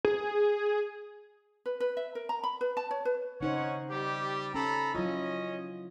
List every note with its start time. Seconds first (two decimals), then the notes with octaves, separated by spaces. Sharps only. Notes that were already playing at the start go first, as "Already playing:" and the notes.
0.05 G#4
1.66 B4
1.80 B4
1.97 E5
2.15 A#4
2.29 A#5
2.44 B5
2.61 B4
2.77 A5
2.91 C#5
3.05 B4
3.41 C#3 C#4 D#4 C5 C#5 F#5
3.90 G3 G4
4.54 C#4 A4 A#5 B5
4.95 F#3 C#4 E4 F4 D#5